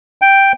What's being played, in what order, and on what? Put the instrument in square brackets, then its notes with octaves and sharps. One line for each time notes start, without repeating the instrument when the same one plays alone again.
[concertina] G5